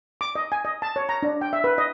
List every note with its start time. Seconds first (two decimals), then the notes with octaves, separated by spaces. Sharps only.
0.21 D6
0.35 D#5
0.52 G#5
0.65 D#5
0.82 A5
0.96 C#5
1.09 A#5
1.23 D4
1.41 G5
1.53 E5
1.64 B4
1.78 D#5